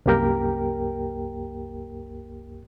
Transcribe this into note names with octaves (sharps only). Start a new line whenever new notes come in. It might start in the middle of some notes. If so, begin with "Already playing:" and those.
C2 F#2 A#3 G4 A#4 G5